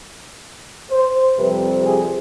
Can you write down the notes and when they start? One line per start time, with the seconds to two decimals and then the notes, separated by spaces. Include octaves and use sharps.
0.91 C5
1.37 F2 C3 G3 C4 B4
1.85 G#4